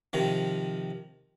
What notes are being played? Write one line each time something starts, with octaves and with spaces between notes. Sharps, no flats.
C3 D#3 F3